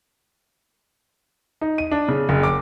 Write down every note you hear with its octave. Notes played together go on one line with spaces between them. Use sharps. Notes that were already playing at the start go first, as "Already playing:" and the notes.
D#4
D#7
D4
C#3
F#1
D6